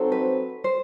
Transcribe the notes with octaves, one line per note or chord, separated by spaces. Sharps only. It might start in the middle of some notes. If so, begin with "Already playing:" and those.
Already playing: F#3 C4 D#4 A4 C5
B4
C5